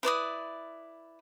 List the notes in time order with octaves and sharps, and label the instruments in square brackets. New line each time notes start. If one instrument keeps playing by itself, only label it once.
[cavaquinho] E4 B4 D5 D#6